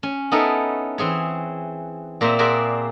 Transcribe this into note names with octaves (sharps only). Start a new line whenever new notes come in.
C#4
B3 D#4 E4 A4 A#4 C#5
E3 C4 G#4 C#5
A#2 A#3 C4 C5 E5
F#4 G#4 A#4 C5 D5 E5